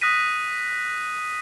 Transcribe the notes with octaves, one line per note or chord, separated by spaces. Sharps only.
D#6 F#6 A#6 B6 D#7